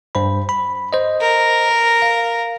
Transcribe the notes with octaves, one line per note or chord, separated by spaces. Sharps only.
G2 C5 B5
B5
C5 D#5
A#4
F5